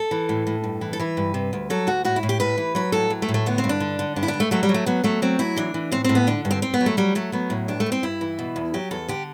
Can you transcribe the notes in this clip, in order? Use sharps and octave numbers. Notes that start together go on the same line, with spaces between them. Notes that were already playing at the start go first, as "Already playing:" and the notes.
Already playing: A4
E3
A2
A2
G2
E3
A4
E3 B4
G2
C3
D2
F#3 A4
D2 F#4
A2 F#4
E4
A2
G4
A2 B4
E3
F#3 B4
A2 A4
F#3
A3
A2
A3
D3 B3
C4
G2
D4
D3
D3
G2 D4
E4
D4
G2
A3
F#3 A3
G3
F#3
A3
F#3 B3
F#3 A3
F#3 C4
F#3 E4
E3 D4
E3
A2 C4
A2 C4
B3
D3 D4
G2
C4
G2 C4
B3
F#3
A3
F#3 G3
F#3 A3
F#3 B3
A2
G2 D4
A3
G2
C4
G2 E4
E3
B2
E2
F#3 G4
E2 A4
D3 G4